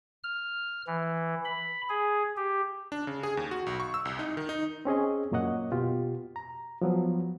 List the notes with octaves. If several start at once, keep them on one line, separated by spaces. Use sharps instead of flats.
F6
E3
B5
G#4
G4
D4
C#3
G#4
D#2
F#4
B1
C#6
E6
C2
D#4
D#3
D#4
C4 C#4 G#4 D#5
F#2 A#2 A#3 C#5 D#5 F#5
B2 F4 G4
A#5
F3 F#3 B3